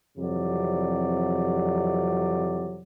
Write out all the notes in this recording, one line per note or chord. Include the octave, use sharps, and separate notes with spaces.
F2 C3 E3 F#3 G3 D5